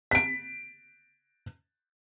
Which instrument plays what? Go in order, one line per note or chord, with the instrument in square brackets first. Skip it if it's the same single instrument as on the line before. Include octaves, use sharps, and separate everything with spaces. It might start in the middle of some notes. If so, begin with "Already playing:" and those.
[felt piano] B6 D7